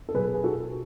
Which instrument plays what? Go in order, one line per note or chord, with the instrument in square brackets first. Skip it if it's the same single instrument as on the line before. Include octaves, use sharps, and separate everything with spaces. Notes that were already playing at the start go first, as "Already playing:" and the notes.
[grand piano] A4
B2 F#3 G#4 B4
G#4
F#4 A4